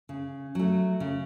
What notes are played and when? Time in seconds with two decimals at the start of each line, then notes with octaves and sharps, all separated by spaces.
0.09 C#3
0.55 F#3 A3
1.00 C#3